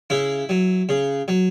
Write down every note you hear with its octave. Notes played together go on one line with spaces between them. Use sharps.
C#3 E4
F#3
C#3
F#3